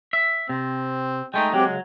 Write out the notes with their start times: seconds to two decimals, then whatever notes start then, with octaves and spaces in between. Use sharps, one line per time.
0.13 E5
0.49 C3 C4
1.34 G#3 A3 D#4 G5
1.53 F#3 G#3 C4 G4 G5
1.66 C#3